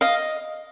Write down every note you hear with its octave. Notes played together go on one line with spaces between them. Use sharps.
D#5 F5